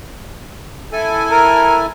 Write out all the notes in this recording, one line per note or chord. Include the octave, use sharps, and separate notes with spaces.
E4 A4 G#5
A#4